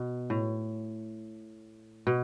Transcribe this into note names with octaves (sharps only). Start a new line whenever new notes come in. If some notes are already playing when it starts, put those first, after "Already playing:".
Already playing: B2
A2
B2